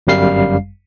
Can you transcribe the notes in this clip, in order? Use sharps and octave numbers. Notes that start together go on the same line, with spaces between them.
G1 F#2 G3 F5 C7